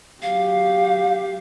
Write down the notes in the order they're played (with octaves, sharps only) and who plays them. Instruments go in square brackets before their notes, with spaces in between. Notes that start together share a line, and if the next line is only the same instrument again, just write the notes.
[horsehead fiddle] F#3 G4 [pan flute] F5